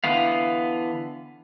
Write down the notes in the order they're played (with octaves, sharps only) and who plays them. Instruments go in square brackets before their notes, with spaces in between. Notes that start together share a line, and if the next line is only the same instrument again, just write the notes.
[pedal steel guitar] D3 E3 B3 F5